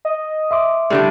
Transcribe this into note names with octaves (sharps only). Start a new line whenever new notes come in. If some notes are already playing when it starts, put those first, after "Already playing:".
D#5
E5 C6 D6
A2 D3 G3 D4